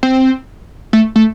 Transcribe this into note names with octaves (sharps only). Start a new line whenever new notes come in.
C4
A3
A3